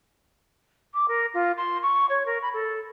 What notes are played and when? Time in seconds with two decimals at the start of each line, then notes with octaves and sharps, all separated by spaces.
0.94 D6
1.08 A#4
1.34 F4
1.57 C6
1.82 C#6
2.09 C#5
2.26 A#4
2.42 B5
2.54 A4